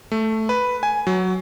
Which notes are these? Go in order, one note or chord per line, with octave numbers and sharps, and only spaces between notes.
A3
B4
G#5
F#3